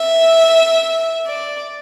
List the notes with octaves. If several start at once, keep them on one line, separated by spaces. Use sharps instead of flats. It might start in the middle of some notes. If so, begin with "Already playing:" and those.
Already playing: E5
D5